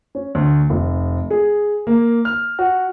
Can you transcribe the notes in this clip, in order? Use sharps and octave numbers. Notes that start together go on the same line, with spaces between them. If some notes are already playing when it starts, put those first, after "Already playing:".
C#4
D2
F1
G#4
A#3
F6
F#4